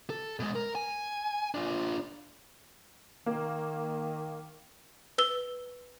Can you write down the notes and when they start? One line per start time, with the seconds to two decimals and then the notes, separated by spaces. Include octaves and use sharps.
0.10 A4
0.40 B2 G#3
0.56 A#4
0.75 G#5
1.54 D4 F4
3.26 D#3 A#3
5.18 B4 E6 G7